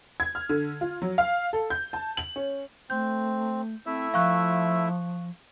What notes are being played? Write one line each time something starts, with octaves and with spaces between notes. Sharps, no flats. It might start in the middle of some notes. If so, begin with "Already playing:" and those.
G#6
F6
D3
F4
F#3
F5
A4
G6
A5
F#7
C#4
A3 C4 G6
A3 C4 E4 E5
F3 F5 C#6 F#6